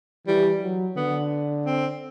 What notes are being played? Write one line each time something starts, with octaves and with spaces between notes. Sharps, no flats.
E3 G3
F#3
D3 B3
C4